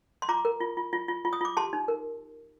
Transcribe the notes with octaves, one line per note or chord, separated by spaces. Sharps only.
C6
F4 A#5 D6
A#4
F4
F4
F4
F4
F4
D#6
F4 D6
G4 A5 C6
D#4
A#4